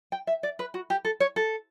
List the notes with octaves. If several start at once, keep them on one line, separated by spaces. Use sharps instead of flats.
G5
E5
D5
B4
F#4
G4
A4
C#5
A4